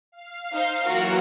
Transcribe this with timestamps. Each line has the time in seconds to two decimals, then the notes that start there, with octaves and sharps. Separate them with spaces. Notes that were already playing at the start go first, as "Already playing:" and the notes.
0.12 F5
0.53 D#4 C5 C6
0.86 E3 F#3 A#3 F4 F#4 A#4